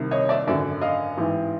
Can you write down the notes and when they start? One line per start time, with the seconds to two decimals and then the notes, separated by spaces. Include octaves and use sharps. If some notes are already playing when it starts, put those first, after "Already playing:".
Already playing: C2 C3 D#3
0.11 C#5 D#5
0.29 D5 E5
0.47 G#1 F#2 D3 D5 E5
0.82 D#5 F5
1.17 A1 G#2 E3